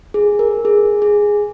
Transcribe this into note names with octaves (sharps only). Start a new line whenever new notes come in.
G#4
A#4
G#4
G#4